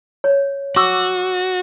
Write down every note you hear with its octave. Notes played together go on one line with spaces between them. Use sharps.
C#5
F#4 C#6 D6 E6